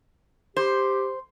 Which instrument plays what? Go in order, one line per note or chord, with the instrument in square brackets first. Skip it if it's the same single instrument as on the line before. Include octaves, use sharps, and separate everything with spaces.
[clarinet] G4 [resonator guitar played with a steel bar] C5